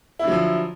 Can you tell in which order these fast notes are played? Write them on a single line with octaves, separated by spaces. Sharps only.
E4 D3 F#3 F3